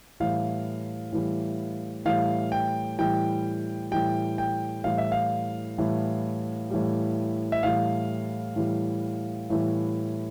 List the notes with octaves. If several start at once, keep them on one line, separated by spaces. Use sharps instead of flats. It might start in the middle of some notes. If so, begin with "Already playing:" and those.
A2 E3 G3 F5
A2 E3 G3
A2 E3 G3 F5
G5
A2 E3 G3 G5
A2 E3 G3 G5
G5
A2 E3 G3 F5
E5
F5
A2 E3 G3
A2 E3 G3
E5
A2 E3 G3 F5
A2 E3 G3
A2 E3 G3